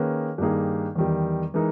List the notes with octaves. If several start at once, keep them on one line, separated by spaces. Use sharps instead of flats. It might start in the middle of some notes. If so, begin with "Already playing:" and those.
Already playing: D#3 A#3 C#4 G#4 B4
G2 D#3 A#3 D#4 G#4
E2 D#3 G3
E3 G#3 D#4 A#4